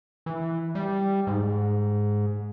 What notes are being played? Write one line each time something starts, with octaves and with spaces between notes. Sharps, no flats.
E3
G3
G#2